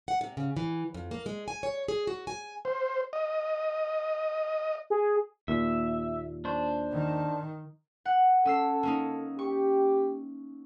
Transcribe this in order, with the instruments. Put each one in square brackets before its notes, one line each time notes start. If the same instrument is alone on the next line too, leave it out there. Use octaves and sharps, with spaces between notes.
[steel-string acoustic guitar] F#5
C3
C#3
E3
F2
A#3
G#3
G#5
C#5
G#4
F#4
G#5
[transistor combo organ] C5
D#5
[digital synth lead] G#4
[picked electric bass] D#2 A#2 [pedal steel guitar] E5
[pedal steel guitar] D4 C5
[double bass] D#3
[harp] F#5
[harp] C#4 E6 C7 [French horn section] A4
[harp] A#3 C#4 D#4
[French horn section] G4 [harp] C#6